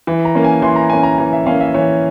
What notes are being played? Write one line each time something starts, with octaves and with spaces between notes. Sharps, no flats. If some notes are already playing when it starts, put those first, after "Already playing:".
E3
A#5
A#3 C#4
G#5
E3 C6
A#5
A#3 C#4 G#5
A#5
E3 G#5
E5
A#3 C#4 F5
E5
E3 C#5